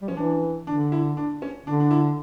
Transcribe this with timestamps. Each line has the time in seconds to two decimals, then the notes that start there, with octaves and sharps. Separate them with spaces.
0.02 G3
0.08 F3 C#4
0.17 E3 D4
0.67 D3 D4
0.92 E4
1.17 D4
1.42 C#4
1.66 D3 D4
1.80 D4
1.91 E4